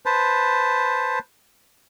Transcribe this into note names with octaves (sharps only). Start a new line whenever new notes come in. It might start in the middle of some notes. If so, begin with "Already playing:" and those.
B4 C5 A5